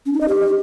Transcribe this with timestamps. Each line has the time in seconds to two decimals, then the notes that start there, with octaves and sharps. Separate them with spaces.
0.06 C#4
0.13 D#4
0.21 D#5
0.28 G4